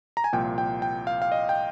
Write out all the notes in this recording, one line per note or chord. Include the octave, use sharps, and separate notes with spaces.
A#5
G#5
C2 A#2 F3 G5
G5
G5
F5
F5
D#5
G5